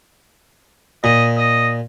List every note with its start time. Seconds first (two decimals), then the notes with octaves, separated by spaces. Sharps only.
1.04 A#2 D#5
1.38 D#5